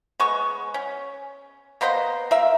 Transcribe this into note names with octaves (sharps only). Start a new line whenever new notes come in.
G#3 B3 C#6
C#4
A#3 B3 C5 D#5
A#3 E5